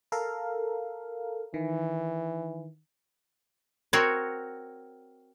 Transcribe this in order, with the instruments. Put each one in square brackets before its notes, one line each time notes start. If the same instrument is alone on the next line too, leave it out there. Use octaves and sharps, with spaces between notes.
[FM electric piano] A4 A#4 F5
[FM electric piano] D#3 [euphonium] E3
[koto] C4 F#4 A#4 C#5